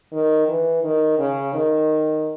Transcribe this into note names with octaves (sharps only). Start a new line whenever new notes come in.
D#3
E3
D#3
C#3
D#3